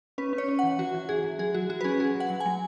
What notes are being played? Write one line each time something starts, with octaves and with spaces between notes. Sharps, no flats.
C#4 B4
C#4
C#5
C#4
F#5
E3
E3 F#4
E3
E3 G#4
E3
F#3 G#4
F#3 F#4
F#3 F#4
B4
C#4 G#4
F#3 G#4
F#3
F#5
F#3
G#5
F#3